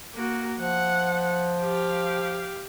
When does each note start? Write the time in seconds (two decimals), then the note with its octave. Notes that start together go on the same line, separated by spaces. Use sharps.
0.15 A#3 F#4
0.60 F3 F#5
1.62 G4 F5